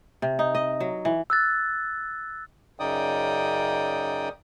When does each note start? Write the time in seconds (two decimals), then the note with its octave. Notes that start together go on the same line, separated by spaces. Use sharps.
0.22 C3
0.39 D#4
0.55 D#5
0.80 F#3
1.05 E3
1.30 E6 F#6 A6
2.80 F#2 C#3 D#4 D5 G5 D#6